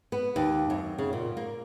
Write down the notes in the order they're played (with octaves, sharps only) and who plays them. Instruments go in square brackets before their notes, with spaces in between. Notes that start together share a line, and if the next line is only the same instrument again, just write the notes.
[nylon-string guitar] B3
D#2
F#2
C#3
A#2
A#3